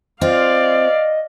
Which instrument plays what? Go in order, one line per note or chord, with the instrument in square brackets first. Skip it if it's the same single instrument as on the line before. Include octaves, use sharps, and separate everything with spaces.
[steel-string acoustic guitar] C4 F4 [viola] D5 F5 [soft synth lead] D#5